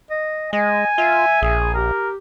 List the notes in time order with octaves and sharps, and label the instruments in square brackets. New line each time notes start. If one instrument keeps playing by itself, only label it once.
[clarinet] D#5
[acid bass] G#3 [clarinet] D#5 [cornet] G#5
[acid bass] F4 [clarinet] E5
[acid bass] A#1 [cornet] G#4
[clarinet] G4 [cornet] A#4